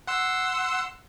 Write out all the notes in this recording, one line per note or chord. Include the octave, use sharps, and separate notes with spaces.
F#5 C6 E6